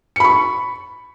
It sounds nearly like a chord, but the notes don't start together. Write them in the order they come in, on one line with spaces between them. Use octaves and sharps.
C#7 B5 C#6